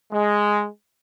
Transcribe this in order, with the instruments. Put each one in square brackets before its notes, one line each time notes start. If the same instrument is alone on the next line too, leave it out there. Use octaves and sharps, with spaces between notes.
[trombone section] G#3